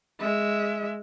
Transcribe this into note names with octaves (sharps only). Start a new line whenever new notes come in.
G#3 E5